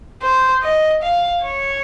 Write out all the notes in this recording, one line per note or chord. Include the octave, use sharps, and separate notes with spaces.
C5
D#5
F5
C#5